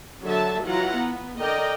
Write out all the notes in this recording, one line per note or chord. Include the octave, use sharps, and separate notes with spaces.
D3 F#3 A4 E5 A5
E3 F#3 E4 F4 F#5 A#5
B3
D3 A#4 D5 D#5 G5 A#5